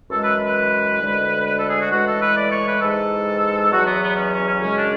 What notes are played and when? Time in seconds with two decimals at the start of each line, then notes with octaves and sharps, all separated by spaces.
0.11 F#2 E3 G#3 A4
0.23 B4
0.45 B4
1.01 D2 D3 G#3
1.46 B4
1.57 A4
1.69 G#4
1.79 F#4
1.91 A2 E3 G#3 F#4
2.06 A4
2.21 B4
2.36 D5
2.50 C#5
2.67 B4
2.81 G#2 E3 G#3 A4
3.71 E2 B2 F#3 F#4
3.87 B3
4.01 B3
4.16 C#4
4.31 C#4
4.46 C#4
4.61 F#2 C#3 G#3 C#4
4.76 D4